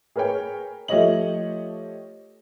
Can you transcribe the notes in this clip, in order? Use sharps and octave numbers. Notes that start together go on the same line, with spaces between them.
G#4 A#4 B4 C#5 G5
F3 A3 G4 C#5 D#5 F#7